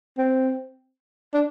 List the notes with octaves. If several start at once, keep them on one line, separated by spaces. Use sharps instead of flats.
C4
D4